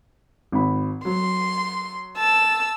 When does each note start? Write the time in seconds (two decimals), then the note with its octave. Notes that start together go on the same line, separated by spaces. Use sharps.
0.52 G#1 B5
1.05 F#3 C6
2.17 A5 E6